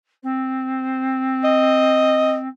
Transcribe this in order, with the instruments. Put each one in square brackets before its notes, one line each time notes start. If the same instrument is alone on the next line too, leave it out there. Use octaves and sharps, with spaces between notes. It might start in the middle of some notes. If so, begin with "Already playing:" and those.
[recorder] C4
[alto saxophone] D#5